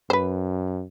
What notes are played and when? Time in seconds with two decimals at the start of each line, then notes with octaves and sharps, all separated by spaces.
0.10 F#2 B4 C5